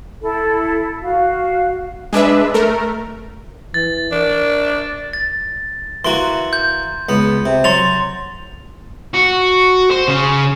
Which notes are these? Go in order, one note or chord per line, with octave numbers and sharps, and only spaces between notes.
E4 A4
F#4 F5
G#3 D4 B4 E5
A3 A#4
E3 A6
D4 A#4
A6
E3 A#3 F#4 C6
G6
C#2 B3
C3
F#3 C6 A6 F7
F#4
C5
C#3